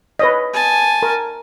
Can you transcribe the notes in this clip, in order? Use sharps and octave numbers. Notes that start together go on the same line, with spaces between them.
B4 C#5 D#5
G#5 A5
A#4